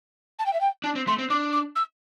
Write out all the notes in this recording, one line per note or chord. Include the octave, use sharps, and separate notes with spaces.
A5
G5
E5
G5
D4 A5
C4
A3 C6
C4
D4 D6
D6
E6